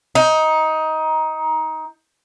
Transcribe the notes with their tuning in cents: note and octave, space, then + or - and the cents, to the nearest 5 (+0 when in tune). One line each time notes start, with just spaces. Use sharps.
D#4 +15